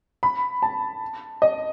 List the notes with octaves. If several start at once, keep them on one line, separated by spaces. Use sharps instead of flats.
B5
A5
D#5